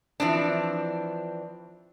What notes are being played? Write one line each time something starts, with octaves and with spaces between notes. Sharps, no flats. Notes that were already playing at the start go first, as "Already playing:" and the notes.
E3 F3 C4 D4